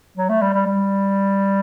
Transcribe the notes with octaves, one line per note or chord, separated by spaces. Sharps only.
F#3
A3
G3
G3
G3